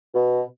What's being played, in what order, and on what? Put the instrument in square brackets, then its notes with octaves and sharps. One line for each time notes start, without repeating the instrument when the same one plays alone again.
[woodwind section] B2